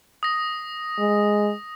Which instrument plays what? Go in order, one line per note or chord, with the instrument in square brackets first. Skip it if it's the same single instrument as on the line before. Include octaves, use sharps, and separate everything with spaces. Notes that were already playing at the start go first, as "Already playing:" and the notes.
[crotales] D#6 A#6
[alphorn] G#3